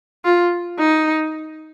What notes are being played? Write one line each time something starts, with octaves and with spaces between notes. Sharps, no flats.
F4
D#4